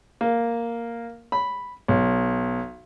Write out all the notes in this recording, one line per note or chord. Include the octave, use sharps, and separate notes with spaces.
A#3
B5
B1